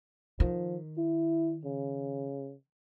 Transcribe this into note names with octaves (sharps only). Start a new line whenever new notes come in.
D#3 F3
E4
C#3